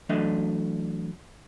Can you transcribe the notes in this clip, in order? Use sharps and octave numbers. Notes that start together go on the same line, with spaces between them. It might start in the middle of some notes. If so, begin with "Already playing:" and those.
E3 F#3 A3 D4 D#5 E5